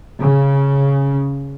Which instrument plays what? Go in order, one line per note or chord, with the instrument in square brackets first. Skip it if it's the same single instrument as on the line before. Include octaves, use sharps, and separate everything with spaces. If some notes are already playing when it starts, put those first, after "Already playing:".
[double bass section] C#3